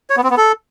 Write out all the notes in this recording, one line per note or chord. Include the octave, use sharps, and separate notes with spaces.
C#5
B3
C4
B3
A4